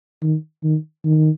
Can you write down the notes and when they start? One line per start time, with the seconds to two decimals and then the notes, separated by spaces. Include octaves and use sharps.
0.22 D#3
0.63 D#3
1.05 D#3